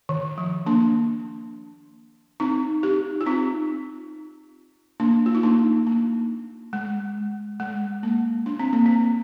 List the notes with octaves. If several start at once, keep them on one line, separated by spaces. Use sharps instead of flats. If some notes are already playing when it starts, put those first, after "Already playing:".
D#3
F3
A#3 D4
C4 D#4
D#4 G4
F4
C4 D#4
A#3 D4
F4
D#4
A#3 D4
A#3
G#3
G#3
A#3
D4
C4
A#3
C4